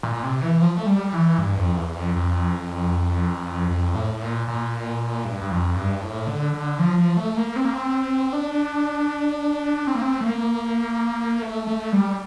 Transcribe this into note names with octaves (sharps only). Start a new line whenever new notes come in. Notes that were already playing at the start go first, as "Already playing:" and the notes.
A#2
C3
E3
F3
A3
G3
E3
G2
F2
E2
F2
F2
F2
A2
A#2
A#2
G2
G2
F2
G2
A2
D3
D3
F3
F3
A3
A#3
C4
A#3
C4
D4
C4
A#3
C4
A3
A#3
A3
A3
G3